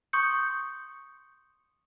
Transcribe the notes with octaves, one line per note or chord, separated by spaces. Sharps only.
C6 C#6 D#6 G6 C#7